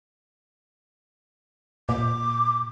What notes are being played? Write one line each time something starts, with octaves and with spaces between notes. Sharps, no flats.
A#2 D6